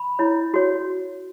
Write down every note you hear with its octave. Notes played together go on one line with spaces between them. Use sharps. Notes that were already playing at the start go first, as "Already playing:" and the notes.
Already playing: B5
E4 C#5
F#4 C#5